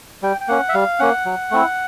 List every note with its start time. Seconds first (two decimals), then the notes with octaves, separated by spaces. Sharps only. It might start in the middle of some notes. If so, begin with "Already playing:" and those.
0.23 G3 G5
0.41 G5
0.48 A#3 C#4 F#5
0.69 E5
0.74 G3 F5
0.99 A#3 C#4 F#5
1.25 F#3
1.51 A3 C4 E4